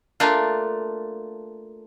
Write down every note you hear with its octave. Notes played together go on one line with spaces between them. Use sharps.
A3 A#3 D4 F4